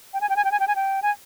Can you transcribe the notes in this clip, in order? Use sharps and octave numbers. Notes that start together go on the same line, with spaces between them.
G5
G#5
G5
G#5
G5
G#5
G5
G#5
G5
G#5